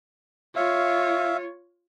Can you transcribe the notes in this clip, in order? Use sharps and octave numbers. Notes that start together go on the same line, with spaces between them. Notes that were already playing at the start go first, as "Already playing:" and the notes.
F4 C#5 E5 F5